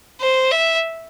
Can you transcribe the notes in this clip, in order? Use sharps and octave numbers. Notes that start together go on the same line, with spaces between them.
C5
E5